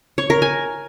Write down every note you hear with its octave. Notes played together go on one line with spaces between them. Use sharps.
C#5
A#4
G#5